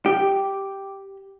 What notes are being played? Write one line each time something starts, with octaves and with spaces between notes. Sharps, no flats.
G4